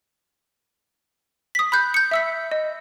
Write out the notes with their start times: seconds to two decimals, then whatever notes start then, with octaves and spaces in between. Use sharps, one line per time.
1.55 D#6 B6
1.72 B5 F#6 G6
1.94 G6 C#7
2.11 E5 E6 B6
2.51 D#5